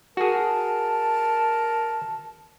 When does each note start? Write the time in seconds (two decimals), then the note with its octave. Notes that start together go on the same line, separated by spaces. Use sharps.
0.17 F#4 G#4 A#4 A5